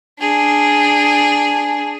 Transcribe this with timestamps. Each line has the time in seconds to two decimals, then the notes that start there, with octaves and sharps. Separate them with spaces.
0.20 D4 G#4